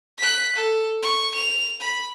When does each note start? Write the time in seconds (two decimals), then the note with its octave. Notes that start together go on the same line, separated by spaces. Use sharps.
0.18 F#6 B6
0.55 A4
1.02 C#6
1.35 F7
1.80 B5